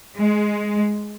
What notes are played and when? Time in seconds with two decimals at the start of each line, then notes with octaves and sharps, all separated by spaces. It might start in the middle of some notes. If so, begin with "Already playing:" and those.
0.17 G#3